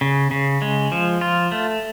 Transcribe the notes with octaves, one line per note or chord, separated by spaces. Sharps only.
C#3
C#3
G#3
F3
F4
A3